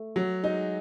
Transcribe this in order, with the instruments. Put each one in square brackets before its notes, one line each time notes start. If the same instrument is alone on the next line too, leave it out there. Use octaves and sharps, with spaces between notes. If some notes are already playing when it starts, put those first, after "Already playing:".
Already playing: [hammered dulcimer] A3
[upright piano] F#3
[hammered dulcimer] G#3 [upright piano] D#4